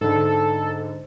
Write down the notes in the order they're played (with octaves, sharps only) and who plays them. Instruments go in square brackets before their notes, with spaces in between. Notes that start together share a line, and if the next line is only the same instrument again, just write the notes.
[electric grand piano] G#2 D3 [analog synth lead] A4